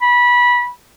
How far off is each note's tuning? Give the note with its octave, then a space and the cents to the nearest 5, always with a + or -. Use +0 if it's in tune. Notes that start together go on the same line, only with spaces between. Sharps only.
B5 -20